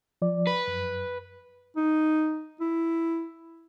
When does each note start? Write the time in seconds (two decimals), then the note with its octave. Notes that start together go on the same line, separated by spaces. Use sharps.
0.22 F3 D5
0.47 B4
0.67 F#2
1.77 D#4
2.60 E4